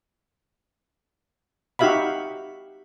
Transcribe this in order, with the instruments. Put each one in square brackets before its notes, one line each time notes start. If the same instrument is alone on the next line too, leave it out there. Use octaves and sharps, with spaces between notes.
[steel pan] D#4 F#4 G4 E5 F5 B5